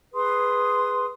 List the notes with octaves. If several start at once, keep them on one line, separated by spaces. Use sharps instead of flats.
G#4 B4 C6 D#6